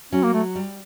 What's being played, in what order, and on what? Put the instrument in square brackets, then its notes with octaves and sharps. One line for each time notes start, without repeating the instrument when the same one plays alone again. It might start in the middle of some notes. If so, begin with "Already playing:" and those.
[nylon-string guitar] F#3 [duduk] C#4
[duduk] A#3
A3
[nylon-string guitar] G3